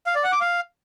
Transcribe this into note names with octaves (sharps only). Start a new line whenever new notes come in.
F5
D5
F#5
D6
F5